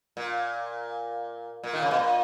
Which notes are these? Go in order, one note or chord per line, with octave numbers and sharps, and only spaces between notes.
A#2
A#2
D#3
C#3
B2
A#2